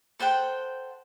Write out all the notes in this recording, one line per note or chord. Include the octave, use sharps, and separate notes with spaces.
A4 C5 F#5 G5